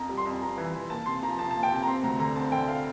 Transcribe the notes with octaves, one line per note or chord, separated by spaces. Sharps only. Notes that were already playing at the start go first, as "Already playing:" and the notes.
Already playing: F2 A#5
G3
C6
F2
G3 A#5
E3
E3
A#3 A5
C3 C6
F3 A#5
F2 A5
A#3 A5
G5
C3 A5
A#5
C4 C6
D2 A#5
D3 A#5
C4 A5
D3 G5
F5